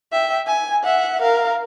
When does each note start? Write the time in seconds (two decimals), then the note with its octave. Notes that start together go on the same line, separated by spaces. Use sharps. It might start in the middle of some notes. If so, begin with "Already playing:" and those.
0.12 E5 G5
0.47 G#5
0.84 E5 F#5
1.22 A#4 F5